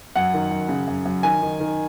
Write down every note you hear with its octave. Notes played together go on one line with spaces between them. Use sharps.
F#2 F#5
D#3
F#2
C#3
F#2
F#2
D#3 G#5
D#3
D#3